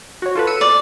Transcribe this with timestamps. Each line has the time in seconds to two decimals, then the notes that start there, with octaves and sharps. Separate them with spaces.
0.22 F#4 C#5
0.35 F4 A4 B4
0.47 E6 C#7 D#7
0.61 D5